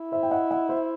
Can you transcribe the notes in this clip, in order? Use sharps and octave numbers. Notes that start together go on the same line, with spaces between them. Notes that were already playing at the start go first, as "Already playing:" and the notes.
Already playing: E4
C5 E5
G5
D#5 F#5
D#5 F#5
C5 E5